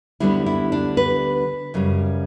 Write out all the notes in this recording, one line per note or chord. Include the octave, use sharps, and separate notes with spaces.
D2 D3 G3 B3 D4 E4
E4
D4
B4
F#2 C#3 G3